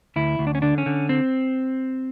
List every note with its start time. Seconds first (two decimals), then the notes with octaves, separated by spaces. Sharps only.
0.16 D2 E4
0.39 D2
0.47 D4
0.55 C#4
0.62 D3 D4
0.78 C#4
0.86 D3
1.09 C4